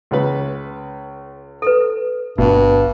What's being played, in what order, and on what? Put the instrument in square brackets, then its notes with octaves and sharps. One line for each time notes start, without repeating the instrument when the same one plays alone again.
[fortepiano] C#2 C#3 B4
[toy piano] A4 B4
[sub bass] G1 [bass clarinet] G2 [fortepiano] B2 F#4